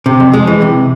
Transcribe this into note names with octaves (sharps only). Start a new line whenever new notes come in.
C3
F2
G#3
E3
C3